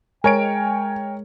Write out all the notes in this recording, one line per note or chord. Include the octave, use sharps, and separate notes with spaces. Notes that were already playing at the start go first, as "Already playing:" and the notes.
G#3 A#4 C#5 G5 G#5 D7